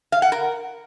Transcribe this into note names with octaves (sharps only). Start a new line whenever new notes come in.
F5
F#5
A#4